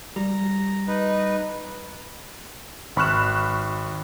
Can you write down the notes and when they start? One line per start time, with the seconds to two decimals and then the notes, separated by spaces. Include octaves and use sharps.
0.16 G3 A#5
0.87 D#4 B4
2.96 G#1 B5 C#6 F6 F#6 E7